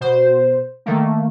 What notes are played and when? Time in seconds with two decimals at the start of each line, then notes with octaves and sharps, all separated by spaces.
0.01 B2 C5
0.86 D#3 A3 A#3